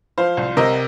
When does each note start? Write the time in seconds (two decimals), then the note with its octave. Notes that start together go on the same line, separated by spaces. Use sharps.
0.18 F3 C5 F5
0.37 C2
0.57 C3 A#4 D#5